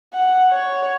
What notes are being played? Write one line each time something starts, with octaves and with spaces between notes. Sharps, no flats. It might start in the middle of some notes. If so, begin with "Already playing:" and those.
F#5
C#5